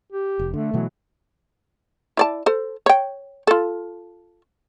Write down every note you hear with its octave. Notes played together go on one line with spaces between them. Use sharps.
G4
F1
D3 A3
B2 E3 F#3
E4 D5 A5
A4 C5
C#5 G5
F4 A4